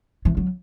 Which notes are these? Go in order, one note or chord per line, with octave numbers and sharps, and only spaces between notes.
E3
F#3